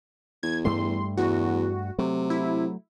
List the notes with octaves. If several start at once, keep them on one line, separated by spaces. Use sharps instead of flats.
E2 G#6
G2 G3 A3 C6
E2 F#4
C3 F#3 A3
E4